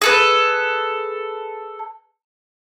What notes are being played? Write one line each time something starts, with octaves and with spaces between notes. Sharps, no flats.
G#4 A4 B4